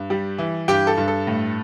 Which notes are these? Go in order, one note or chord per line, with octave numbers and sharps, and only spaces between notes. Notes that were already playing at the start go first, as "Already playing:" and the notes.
Already playing: G2
G3
E3
G2 G4 G5
A4
G2
A4
A2